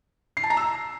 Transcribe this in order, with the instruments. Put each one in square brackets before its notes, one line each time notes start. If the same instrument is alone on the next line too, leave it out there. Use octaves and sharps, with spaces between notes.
[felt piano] C7
A5
A#5
E6